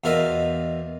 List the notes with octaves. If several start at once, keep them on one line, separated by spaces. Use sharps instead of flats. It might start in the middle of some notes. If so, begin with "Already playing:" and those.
E2 B2 F4 A#4 D#5 E5